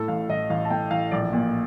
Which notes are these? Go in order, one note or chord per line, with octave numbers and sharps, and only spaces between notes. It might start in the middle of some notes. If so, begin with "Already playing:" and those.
Already playing: A2 A4
A1 F5
A1 D#5
A1 F5
A5
A2 G5
A1 F5
A#1 D5
A#2